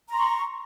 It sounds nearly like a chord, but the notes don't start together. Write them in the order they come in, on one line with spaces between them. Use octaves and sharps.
A#5 C6 C#6